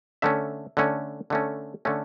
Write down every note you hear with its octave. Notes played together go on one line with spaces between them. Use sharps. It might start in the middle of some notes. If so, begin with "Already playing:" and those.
D3 A3 C#4 E5
D3 A3 C#4
D3 A3 C#4
D3 A3 C#4